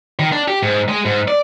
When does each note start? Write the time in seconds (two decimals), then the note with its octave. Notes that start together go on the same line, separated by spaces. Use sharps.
0.19 D#3
0.32 D4
0.48 G4
0.62 G#2
0.89 G#3
1.05 G#2
1.28 D5